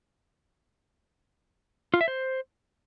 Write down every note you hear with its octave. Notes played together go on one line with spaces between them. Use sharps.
F4
E5
C5